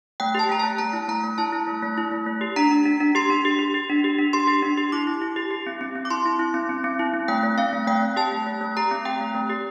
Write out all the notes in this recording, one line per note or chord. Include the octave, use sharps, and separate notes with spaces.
A3 G5
G4 A5
A3 A#5
A3 A5
A3 A#5
E4
A3 A#5
A3
E4 A5
E4
A3
A3
E4
A3
A3
G4
D4 A#5
D4
D4
D4
G4 C6
D4
G4
G4
G4
D4
G4
D4
G4 C6
G4
D4
G4
E4 D6
E4
E4
G4
G4
C4
C4
C4
D6
E4 C6
E4
E4
C4
C4
C4
E4
C4
A3 G5
A3
C4 F5
A3
A3 G5
A3
G4 A5
A3
A3
A3
G4 A#5
C4
G4 G5
A3
A3
G4